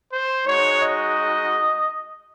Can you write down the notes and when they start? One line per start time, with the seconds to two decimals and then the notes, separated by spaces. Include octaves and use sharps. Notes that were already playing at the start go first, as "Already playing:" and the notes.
0.11 C5
0.46 G#3 D#4 F#4 C#5
0.81 D#5